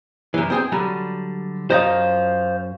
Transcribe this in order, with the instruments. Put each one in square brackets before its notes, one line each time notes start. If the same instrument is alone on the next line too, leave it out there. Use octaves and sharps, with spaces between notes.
[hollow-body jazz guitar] F#2 E3
C4 G#4 G5
D3 F#3 G3
[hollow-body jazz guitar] F#2 D#5 [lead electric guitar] C5 F5